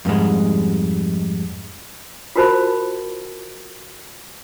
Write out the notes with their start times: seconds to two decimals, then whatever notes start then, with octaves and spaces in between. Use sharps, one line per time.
0.05 F2 G#2 G3 G#3
2.36 F4 F#4 A#4 C5 A5 B5